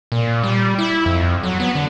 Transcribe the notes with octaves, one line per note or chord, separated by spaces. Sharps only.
A#2
G3
E4
F2
F#3
B3
D3